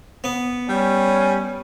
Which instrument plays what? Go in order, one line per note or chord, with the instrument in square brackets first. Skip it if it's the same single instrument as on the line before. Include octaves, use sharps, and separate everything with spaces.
[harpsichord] B3
[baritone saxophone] G3 [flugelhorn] C#4